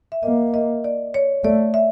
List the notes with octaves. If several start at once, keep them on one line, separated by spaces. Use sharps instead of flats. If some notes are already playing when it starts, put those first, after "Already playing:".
E5
A#3 D#5
D#5
D5
C#5
A3 D5
E5